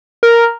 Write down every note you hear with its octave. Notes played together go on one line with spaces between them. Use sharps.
A#4